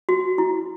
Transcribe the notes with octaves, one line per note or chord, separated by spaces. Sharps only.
F#4
E4